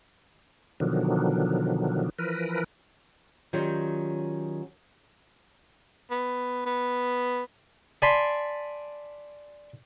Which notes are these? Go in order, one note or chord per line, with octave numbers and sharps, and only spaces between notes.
B2 D3 D#3 F3 F#3
E3 F3 A#4 B4
D#3 F#3 C#4 F4 G4 D5
B3
B3
D5 G#5 A5 B5 C6